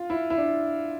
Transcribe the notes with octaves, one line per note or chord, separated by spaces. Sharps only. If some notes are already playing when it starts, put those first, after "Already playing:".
Already playing: F4
E4
E4
D4